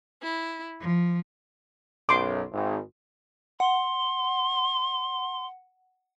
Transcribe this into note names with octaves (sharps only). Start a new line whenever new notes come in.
E4
F3
B1 F#2 C6 D6
G#1
F#5 C6